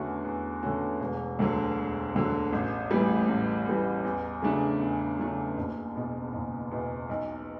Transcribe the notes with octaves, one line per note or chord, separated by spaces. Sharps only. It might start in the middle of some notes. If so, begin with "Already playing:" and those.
Already playing: E2 D3 A3 C#4 F#4
E2
D3 A3 C#4 F#4
E1
D2 D3 F#3
E1
D2 D3 F#3
A1
A2 E3 G3
A1
A2 E3 G3
E2
C#3 F#3 A3 D4
E2
C#3 F#3 A3 D4
F#1
E2 B2
F#1
E2 B2
B1